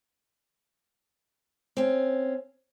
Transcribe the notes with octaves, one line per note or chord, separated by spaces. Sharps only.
C4 C#4